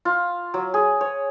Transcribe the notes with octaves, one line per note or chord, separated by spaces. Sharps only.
F4
F#3
G#4
C#5